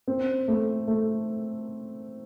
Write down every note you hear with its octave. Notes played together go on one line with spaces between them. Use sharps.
C4
A3
A3